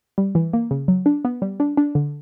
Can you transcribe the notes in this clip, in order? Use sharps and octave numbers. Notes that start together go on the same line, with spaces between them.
G3
E3
A#3
C#3
F#3
D4
B3
G3
D4
D4
D3